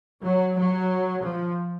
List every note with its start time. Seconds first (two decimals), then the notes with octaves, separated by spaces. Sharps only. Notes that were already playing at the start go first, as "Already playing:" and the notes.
0.23 F#3
0.56 F#3
1.22 F3